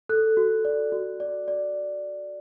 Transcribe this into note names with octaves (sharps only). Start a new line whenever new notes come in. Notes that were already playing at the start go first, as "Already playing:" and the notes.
A4 F#6
F#4
D5
F#4
D5
D5